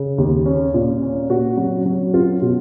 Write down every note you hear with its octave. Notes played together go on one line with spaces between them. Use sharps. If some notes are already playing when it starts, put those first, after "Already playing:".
Already playing: C#3
D#2
C#4
A#2
C#4
A#2 F#4
F#3
F#3
C#4 F4
B2